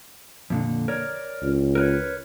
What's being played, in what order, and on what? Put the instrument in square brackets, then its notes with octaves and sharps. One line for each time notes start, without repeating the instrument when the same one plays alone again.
[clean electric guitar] F2 A#2 D3
A#4 C#5 D5
[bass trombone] C#2
[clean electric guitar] A#4 B4 C#5